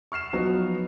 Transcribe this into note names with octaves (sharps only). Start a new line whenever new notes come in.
C#6 F6 C7 E7
F3 F#3 B3 D#4 F#4